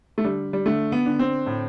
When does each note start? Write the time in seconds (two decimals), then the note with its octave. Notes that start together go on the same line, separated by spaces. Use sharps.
0.18 A3
0.24 D3 G3
0.53 G3
0.66 D3 A3
0.92 B3
1.06 D3
1.19 C4
1.46 A2